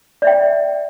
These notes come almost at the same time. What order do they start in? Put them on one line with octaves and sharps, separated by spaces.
D5 E5 G5